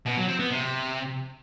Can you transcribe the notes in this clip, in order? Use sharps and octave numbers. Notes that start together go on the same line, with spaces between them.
B2
F#3
C4
B3
C3